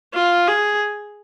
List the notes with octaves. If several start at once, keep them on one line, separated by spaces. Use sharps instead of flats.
F4
G#4